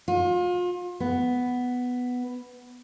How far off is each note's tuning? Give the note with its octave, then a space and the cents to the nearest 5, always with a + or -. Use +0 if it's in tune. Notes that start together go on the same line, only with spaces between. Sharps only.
F4 +35
B3 +5